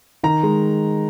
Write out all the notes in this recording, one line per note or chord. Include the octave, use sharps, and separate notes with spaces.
D#3 A#5
G#3